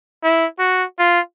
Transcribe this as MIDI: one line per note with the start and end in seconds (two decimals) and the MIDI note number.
0.23 0.46 64
0.59 0.84 66
0.99 1.20 65